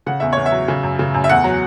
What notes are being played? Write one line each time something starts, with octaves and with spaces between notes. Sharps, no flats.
C#3 F#5
E2 E5
E2 C#5
E5
F#3
C#3
F#2
C#3
F#2
E5
E2 F#5
F#3